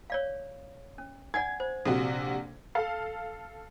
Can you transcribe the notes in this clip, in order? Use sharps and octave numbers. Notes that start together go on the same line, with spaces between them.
C#5 D5 F5
C#4
D5 F#5 G#5 G#6
C5
A#1 C3 F#4 A4
A4 F5